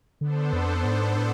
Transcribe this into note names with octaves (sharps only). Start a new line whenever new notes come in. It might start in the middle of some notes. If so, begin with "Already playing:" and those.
D3 B3 D4 A4 C5
F2
G#2
A2